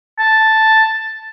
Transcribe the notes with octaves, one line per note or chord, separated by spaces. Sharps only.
A5